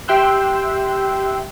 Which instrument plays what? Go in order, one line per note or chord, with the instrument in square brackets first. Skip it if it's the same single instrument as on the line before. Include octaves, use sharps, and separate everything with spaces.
[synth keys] G4 E5 G5 C6 E6 F#6